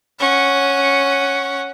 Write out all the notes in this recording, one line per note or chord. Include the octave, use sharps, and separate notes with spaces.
C#4 F#5